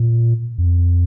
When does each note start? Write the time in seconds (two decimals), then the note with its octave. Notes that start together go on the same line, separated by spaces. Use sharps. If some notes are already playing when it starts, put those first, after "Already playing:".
Already playing: A#2
0.58 F2